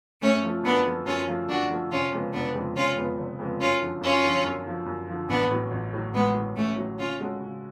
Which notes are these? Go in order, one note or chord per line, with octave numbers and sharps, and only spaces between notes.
F#2 A3 C#4
F3 A3 F4
F#2 B3 D4
F3 A3 F4
F#2 C#4 F4
F3 A3 F4
F#2 D4 F#4
F3 A3 F4
F1 C#4 F4
F2 C#3 G#3 B3
F1 B3 D4
F2 C#3 G#3 B3
F1 C#4 F4
F2 C#3 G#3 B3
F1
F2 C#3 G#3 B3
F#2 C#4 F4
D3 F3
F#2 C#4 F4
D3 F3
F#2
D3 F3
F#2
D3 F3
A1 B3 D4
A2 F#3
A1
A2 F#3
A1 G#3 B3
A2 F#3
A1 A3 C#4
A2 F#3
C#3 C#4 F4
G#3 C#4 F#4 A4
C#3